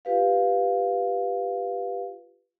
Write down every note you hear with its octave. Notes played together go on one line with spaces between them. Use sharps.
F4 G4 B4 F5